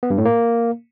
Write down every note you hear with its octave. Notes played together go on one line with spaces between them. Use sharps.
B3
G2
A2
A#3